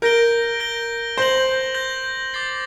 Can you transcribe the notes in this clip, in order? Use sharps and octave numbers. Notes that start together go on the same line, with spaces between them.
A#4 G6 A#6 D7 G7
G6 A#6 D7 G7
C5 G6 A#6 F#7
G6 A#6 F#7
D6 A6 C7 G7